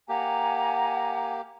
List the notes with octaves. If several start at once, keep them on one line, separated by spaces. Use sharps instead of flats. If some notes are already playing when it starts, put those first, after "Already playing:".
A#3 G4 F#5 G#5 A#5